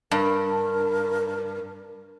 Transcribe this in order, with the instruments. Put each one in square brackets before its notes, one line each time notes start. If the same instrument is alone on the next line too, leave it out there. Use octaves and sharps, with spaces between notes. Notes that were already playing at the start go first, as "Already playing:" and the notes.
[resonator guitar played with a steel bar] G2 [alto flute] A#4